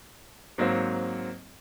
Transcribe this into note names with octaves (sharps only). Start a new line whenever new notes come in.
G#2 F#3 A#3 C4